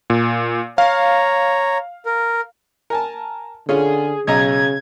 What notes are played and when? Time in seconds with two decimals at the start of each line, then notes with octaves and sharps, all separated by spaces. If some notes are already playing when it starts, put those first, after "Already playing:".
0.10 A#2
0.78 C#5 F5 A#5
2.06 A#4
2.90 A#4 G#5 A5
3.69 D3 C#4 F4 G#4
4.27 B1 C#3 D#5 A#5 G#6